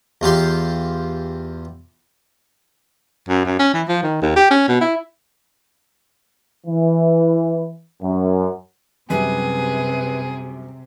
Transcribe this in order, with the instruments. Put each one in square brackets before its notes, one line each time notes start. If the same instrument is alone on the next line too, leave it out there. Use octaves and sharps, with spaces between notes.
[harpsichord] E2 F4 G4 C6
[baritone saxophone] F#2
F#2
C#4
E3
F3
D#3
D#2
G4
C#4
B2
E4
[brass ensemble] E3
F#2
[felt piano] F#2 G3 [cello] C3 [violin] G#4 [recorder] B4